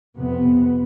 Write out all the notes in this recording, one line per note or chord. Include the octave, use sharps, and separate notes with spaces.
F2 C3 B3